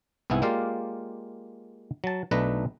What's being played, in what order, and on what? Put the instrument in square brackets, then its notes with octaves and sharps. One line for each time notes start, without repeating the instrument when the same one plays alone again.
[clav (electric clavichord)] C2 G#2 B3 E4 G#4 G#5
G#3 A#3 F4 G4 D5 F5
F#3 A5
B1 A3 D4 D#4 B4 A#5